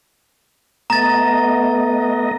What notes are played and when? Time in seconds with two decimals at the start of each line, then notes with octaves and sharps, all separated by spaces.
0.90 A3 B3 D#5 A#5 A6